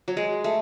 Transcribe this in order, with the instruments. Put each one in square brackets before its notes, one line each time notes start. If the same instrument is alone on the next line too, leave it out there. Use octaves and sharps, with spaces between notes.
[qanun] F#3
G#3
A3